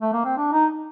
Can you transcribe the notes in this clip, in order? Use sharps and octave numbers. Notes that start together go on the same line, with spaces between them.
A3
A#3
C4
D4
D#4